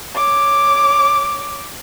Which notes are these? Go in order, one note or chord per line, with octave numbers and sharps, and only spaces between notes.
C#5 D6